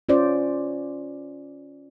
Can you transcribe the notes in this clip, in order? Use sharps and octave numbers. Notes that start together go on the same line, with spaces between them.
C#4 F4 C5 D5